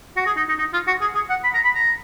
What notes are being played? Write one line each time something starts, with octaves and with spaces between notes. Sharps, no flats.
F#4
G#4
D#4
D#4
D#4
F4
F#4
G#4
G#4
F#5
B5
A#5
B5
A#5